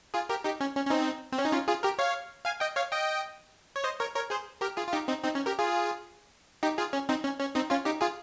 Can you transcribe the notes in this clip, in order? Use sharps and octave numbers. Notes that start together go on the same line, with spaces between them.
F4 G#4
G4 A#4
D#4 G4
C#4
C#4
C#4
C4 D#4
C4
C#4
D#4
C#4 F4
F4 G#4
G4 A#4
C#5 F5
F5 G#5
D#5 G5
C#5 F5
D#5 G5
C#5
C5 D#5
A#4 C#5
A#4 C#5
G#4 C5
G4 A#4
F4 G#4
F4
D#4 G4
C4 D#4
C4 D#4
C#4
G4 A#4
F4 G#4
D#4 G4
F4 G#4
C#4
C4 D#4
C#4
C#4
C4 D#4
C#4 F4
D#4 G4
F4 G#4